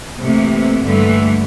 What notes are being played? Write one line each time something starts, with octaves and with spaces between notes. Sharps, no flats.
A2 C3 E3 A#3
G2 D3 E3 G3 A3 A#3